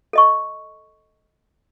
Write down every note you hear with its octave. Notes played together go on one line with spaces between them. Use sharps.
A4 D#5 C#6